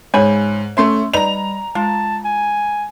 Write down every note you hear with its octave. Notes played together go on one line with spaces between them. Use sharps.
G#2 C#3 C#5 G#5 B5
A3 C#4 E5 C6
G3 D#4 B4 D5 A#5 F7
G#3 F4 A5
G#5